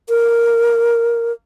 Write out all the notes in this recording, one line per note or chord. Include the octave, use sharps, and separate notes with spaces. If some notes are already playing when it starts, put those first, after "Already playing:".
A#4